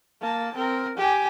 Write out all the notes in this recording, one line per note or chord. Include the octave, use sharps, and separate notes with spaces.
A#3 A5
C4 A#4
G4 G#5